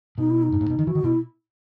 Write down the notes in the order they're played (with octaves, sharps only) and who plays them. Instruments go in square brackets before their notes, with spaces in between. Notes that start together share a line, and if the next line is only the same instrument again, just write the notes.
[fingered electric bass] B2 [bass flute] D#4
[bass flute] E4
D#4
[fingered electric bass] G2
A2
B2
D#3
[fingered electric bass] E3 [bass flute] F#4
[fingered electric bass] D#3
[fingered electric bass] B2 [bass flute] E4